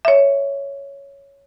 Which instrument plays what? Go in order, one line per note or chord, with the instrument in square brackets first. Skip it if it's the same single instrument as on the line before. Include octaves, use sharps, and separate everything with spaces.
[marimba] C#5 E5